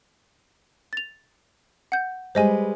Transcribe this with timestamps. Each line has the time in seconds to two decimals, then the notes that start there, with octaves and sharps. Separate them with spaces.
0.93 A6 F7
1.92 F#5 G6
2.35 G3 G#3 B4 C5 D#5 G#5